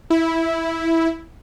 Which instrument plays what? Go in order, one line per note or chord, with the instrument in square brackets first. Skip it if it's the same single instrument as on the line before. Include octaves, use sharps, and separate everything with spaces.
[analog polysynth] E4